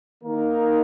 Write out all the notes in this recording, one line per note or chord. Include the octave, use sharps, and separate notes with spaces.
D#3 A#3 D#4 A#4